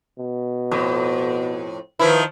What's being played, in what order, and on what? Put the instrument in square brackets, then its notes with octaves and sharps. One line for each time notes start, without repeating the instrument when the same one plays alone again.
[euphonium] B2
[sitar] F2 A2
[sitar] D#3 F3 E4 [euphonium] B4